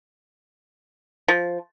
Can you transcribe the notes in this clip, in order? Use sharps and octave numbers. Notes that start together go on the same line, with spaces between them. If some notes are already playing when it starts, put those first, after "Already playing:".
F3